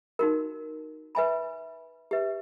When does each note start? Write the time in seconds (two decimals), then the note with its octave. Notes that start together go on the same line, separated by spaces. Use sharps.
0.19 D#4 F#4 A#4
1.15 B4 E5 G#5 B5
2.11 G4 B4 E5